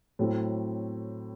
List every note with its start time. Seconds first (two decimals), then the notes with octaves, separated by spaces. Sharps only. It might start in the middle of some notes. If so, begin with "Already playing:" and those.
0.19 A2 F#3 A3 C4